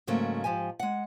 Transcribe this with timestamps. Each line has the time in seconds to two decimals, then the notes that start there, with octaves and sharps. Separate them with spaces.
0.07 G#2 C#3 F#3 A3 A#3
0.44 G#2 F3 G4 G#5
0.79 G#3 F#5